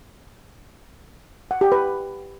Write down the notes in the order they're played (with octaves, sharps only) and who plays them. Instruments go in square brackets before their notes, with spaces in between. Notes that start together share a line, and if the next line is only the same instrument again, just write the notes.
[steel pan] F#5
G4
B4